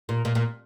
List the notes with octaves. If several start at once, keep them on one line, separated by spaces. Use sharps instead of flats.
A#2
A#2
A#2